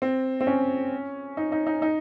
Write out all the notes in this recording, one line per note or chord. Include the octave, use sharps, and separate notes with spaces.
C4
C4
C#4
D#4
D#4
D#4
D#4